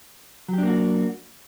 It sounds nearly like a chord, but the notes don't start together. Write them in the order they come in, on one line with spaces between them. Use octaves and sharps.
F#3 G4 D4 A#3 F#4